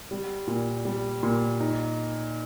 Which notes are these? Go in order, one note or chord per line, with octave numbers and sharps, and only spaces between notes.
G3
A#2
G3
A#2
D#4